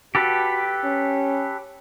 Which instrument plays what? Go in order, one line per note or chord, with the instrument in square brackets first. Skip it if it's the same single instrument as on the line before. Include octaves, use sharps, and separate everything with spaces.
[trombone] F#4 [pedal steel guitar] G4 A4 B4
[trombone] C#4